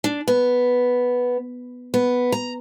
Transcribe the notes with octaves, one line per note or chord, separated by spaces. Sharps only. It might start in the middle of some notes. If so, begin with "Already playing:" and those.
D4
B3
B3
A#5